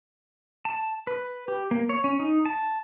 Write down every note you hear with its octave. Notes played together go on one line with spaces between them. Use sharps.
A5
B4
G4
A#3
C#5
C#4
D#4
A5